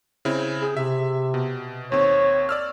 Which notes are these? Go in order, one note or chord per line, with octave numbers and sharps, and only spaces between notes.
C#3 C4 E4
G#4
C3 E5
B2
D#2 C4 C#5
D5 E6 F6